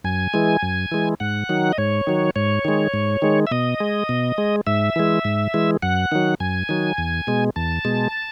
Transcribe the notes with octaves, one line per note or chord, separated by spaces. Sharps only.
F#2 G#5
E3 G#3
F#2
E3 G#3
G#2 F#5
D#3 F#3
D#5
G#2 C#5
D#3 F#3
G#2 C#5
D#3 G#3
G#2
D#3 G#3
E5
B2 D#5
G#3
B2
G#3
G#2 E5
E3 G#3
G#2
E3 G#3
F#2 F#5
D#3 F#3
F#2 G#5
D#3 F#3
E2
B2 G#3
E2 A5
B2 G#3